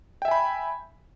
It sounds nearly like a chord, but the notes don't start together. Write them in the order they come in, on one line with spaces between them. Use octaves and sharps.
G5 E5 G#5 B5